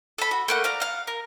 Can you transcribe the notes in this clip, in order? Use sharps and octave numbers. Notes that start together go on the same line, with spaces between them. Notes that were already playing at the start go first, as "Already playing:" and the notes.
A4 B5
F#4
A3 A#3 F#5
D5 F5 A#5
F5 F#5
A#4